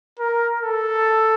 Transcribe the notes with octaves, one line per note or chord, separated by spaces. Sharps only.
A#4
A4